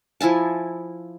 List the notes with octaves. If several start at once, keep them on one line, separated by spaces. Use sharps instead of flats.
F3 E4 G#5 A5